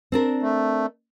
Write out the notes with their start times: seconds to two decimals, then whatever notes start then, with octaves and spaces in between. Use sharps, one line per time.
0.12 C4 D4 A#4
0.42 A3